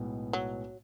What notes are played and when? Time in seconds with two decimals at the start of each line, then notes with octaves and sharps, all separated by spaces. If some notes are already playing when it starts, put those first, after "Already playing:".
Already playing: B1 A2 G#3 B3
0.33 F#3